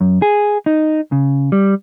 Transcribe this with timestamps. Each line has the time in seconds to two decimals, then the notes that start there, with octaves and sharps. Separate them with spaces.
0.01 F#2
0.22 G#4
0.66 D#4
1.12 C#3
1.52 G3